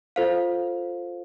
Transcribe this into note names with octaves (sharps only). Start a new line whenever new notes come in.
F4 A4 C5 F5